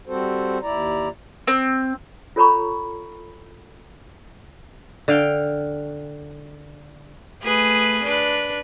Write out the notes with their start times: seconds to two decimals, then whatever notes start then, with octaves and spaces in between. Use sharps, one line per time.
0.07 G3 C4 F#4 A4 C5
0.63 D#2 E4 D5 A#5
1.47 C4
2.36 F4 A4 C#5 A#5 B5 C#6
5.08 D3 F5 G5
7.41 A3 G#4 B4
8.04 D4 B4